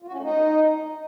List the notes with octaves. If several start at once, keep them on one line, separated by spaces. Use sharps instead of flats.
F4
F#4
C#4
A3
D#4